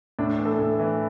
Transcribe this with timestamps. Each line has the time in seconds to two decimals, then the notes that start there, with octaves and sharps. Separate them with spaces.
0.19 A2 D4
0.38 E3
0.45 A4
0.59 A2
0.79 E3